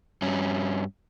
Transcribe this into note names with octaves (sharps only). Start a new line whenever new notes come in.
G2 C#4